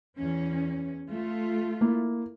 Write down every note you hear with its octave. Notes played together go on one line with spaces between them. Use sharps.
E2 C#4
A3 F4
A#3 E4